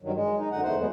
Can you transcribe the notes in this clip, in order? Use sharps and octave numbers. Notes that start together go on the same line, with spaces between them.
G2 D#3 F#3
G#3
D#4
F#2 D3 D#4 F#5
E2 A3 C5 F#5
F#3 G#3 B3